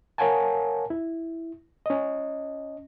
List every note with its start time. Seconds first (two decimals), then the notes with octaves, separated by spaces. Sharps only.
0.18 A#4 C#5 F5 F#5 G#5 A5
0.90 E4
1.86 C#4 D#5